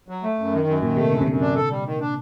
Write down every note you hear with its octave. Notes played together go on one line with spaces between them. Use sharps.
F#3
A3
F#2
D#3
F#2
A#2 D#3
C3 A3
F#2 D3
C3
F#2 D3
D4
A4
G3
D#3
D4